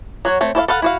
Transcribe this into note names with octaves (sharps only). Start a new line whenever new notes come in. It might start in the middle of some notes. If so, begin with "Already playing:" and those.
F#3 F#4 C#5
A3 C4 C#5
E4 A4 C#5 F5
A4 B4 F5 F#5
E4 F#4 F5